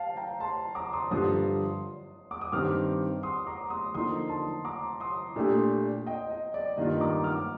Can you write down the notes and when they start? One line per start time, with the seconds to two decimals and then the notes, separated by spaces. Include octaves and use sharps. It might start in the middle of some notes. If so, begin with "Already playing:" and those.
Already playing: F5 G5 A5
0.16 G5 A#5
0.40 A5 C6
0.75 A#5 D6
0.93 C6 D#6
1.11 G2 D3 F3 C6 D#6
2.31 D6
2.41 D#6
2.52 G2 D#3 G3 C4 D6 F6
3.23 C6 D#6
3.47 A#5 D6
3.70 C6 D#6
3.94 D3 F3 A#3 D#4 C6 D#6
4.29 A5 C6
4.65 A#5 D6
5.00 C6 D#6
5.36 A#2 A3 D4 G4
6.06 D#5 G5
6.30 D#5
6.54 D5
6.77 G2 D#3 A#3 F4 D#5
7.01 A#5 D6
7.24 D6 F6